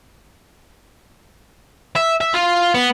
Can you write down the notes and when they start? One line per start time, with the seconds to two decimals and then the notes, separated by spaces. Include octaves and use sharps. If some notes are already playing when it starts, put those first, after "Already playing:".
1.95 E5
2.21 E5
2.34 F4
2.74 B3